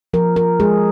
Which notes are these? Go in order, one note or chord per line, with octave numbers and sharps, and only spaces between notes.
F3 A#4
A#4
G#3 G#4